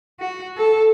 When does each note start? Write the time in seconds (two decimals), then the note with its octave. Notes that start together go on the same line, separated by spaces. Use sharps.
0.20 F#4
0.57 A4